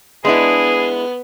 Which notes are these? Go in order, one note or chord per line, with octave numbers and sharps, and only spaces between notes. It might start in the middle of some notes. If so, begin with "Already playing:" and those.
G#3 B3 D4 E4 G#4